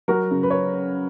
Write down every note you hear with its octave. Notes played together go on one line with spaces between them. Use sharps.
F#3 F#4 A#4
C#3
B4
C#5